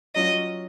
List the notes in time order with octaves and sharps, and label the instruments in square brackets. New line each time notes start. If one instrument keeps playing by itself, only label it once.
[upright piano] F#3 C#4 F4 [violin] D#5